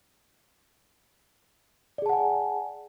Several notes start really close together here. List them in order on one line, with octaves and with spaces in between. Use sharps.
D5 G#4 A5 F#5 G#5